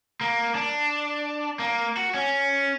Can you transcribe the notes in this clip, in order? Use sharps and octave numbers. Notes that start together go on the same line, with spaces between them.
A#3
D4
A#3
F#4
C#4